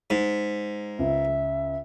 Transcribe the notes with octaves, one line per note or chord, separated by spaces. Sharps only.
G#2
C#2 E5